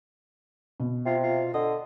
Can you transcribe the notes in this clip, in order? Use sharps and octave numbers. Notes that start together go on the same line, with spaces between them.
B2
C3 F4
F4
D3 D#5